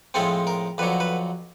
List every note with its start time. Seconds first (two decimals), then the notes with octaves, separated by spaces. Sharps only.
0.14 A2 F3 G#3 C4 A4
0.47 A#4
0.78 F2 D3 F#3 B4
1.00 B4